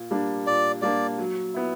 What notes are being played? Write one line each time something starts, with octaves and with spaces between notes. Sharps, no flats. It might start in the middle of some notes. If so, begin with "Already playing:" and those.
Already playing: A#2
G3 A#3 D4
A#2 D5
G3 A#3 D4 D5
F#3
B3 E4